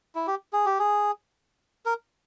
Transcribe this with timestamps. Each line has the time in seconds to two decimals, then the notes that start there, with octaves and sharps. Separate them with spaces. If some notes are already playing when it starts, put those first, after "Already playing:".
0.15 E4
0.27 G4
0.53 G#4
0.66 G4
0.79 G#4
1.86 A#4